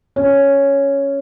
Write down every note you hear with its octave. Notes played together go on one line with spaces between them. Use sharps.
C#4